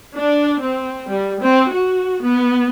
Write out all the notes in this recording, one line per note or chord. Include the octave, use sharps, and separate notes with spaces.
D4
C4
G3
C4
F#4
B3